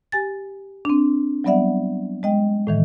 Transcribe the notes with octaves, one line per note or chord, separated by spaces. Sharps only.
G4 G#5 A6
C4 D4
F#3 G3 B3 D5 E5 F#5
G#3 D#5 G5
A2 D#3 E3